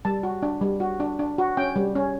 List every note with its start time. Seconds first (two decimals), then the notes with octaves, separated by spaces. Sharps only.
0.05 G3 A5
0.23 F#4
0.43 D4
0.61 G3
0.80 F#4
1.00 D4
1.19 D4
1.38 F#4
1.57 C#4 G5
1.76 G3
1.95 C#4